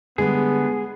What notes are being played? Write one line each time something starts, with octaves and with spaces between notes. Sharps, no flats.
D3 G3 G#3 B3 G#4